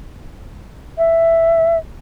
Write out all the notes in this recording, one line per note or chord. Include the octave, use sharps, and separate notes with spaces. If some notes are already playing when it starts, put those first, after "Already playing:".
E5